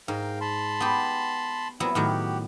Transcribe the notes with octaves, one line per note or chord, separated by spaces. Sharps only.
G#2 A#4 F5 G5
A5 B5 C6
B3 G4
A#2 F#3 B3 C4 E4 E5
A2 D#3 F#3 F#4 G4